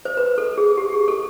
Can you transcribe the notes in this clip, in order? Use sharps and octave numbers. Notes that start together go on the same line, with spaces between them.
C5
B4
A4
G#4
G4
G#4
A4